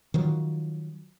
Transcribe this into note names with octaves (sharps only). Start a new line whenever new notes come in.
D#3 F3 F#3